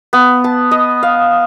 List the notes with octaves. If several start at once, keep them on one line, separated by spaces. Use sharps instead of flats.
B3
A5
D#5
F5